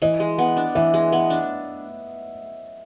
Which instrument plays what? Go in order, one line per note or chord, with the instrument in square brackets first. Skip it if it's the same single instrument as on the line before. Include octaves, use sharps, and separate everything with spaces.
[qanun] E3 [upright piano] D#5
[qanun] G#3
B3
D4
[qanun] E3 [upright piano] E5
[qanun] G#3
B3
D4